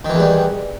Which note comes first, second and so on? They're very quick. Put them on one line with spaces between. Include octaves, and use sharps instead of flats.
D#3 E3 E2 G3